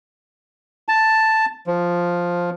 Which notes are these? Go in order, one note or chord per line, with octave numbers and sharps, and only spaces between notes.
A5
F3